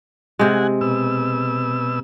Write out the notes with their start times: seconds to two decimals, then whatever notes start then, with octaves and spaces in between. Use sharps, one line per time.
0.39 C3 G#3 F#5 G#5
0.81 B2 E6